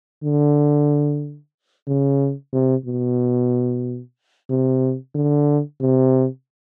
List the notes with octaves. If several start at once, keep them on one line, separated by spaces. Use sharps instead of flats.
D3
C#3
C3
B2
C3
D3
C3